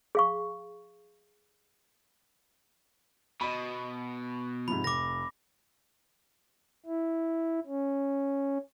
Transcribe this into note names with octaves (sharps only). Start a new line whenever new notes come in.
G#4 F5 C#6
B2 D#5 B5
G#2 C3 F3 B5
F1 D6 A#6
E4
C#4